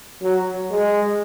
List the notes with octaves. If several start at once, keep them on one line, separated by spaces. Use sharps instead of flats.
F#3
G#3